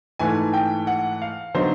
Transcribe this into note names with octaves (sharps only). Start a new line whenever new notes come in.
G#2 E3 A3 G#5
G5
F#5
F5
D3 F#3 B3 D#4 C5